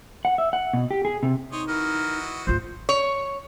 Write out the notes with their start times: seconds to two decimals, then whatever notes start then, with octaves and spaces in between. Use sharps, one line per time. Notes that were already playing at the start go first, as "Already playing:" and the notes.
0.25 F#5
0.38 E5
0.53 F#5
0.73 B2
0.91 G4
1.05 G#4
1.23 C3
1.52 D#4 C5 C#5 D#5
1.68 E3 F#4 A#4 D#5
2.47 G#1 D2 F4 C5
2.89 C#5